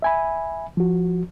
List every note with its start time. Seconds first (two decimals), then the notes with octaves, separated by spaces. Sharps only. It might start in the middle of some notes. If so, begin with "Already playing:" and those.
0.02 E5 G#5 B5
0.77 F3 F#4